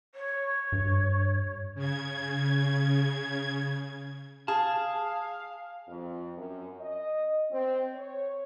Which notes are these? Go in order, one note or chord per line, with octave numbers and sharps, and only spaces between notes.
C#5
G2
C#3 G#6
G#4 F5 A5
F2
F#2
D#5
C4
C#5